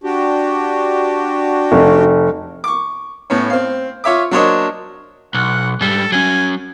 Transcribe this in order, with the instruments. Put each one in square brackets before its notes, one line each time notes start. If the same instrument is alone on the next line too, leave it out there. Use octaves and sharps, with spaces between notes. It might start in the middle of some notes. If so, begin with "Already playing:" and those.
[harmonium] D4 F#4 G4
[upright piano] F1
[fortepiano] C#6 D6
A2 B3 C#4
C4 F5
F4 C#5 E5 D6
F#3 A#3 D4 C5 C#5 D#5
[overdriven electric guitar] B1 [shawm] F#5
[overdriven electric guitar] G#2 G3 [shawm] A4
[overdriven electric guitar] F#3 C#4 [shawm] G#5